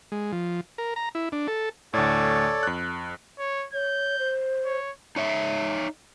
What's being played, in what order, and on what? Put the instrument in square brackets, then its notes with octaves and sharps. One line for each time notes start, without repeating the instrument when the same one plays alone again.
[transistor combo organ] G#3
F3
A#4
A#5
E4
D4
A4
[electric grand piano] D2 A2 [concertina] A4 C#5 D5
[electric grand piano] F2 F#6
[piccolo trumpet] C#5
[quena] C#5 [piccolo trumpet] G6
[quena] C5
[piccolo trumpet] C#5
[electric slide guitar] D#4 C#5 E5